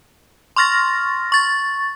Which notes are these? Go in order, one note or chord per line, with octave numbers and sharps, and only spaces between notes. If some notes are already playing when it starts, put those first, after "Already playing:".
C6 C#6 F6 A6 A#6
C#6 A6